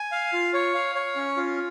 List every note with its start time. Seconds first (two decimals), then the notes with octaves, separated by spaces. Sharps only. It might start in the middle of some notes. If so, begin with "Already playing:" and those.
Already playing: G#5
0.12 F5
0.33 F4
0.54 C#5
0.75 F5
0.95 C#5
1.16 C#4
1.37 F4